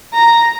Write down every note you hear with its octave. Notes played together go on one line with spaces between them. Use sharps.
A#5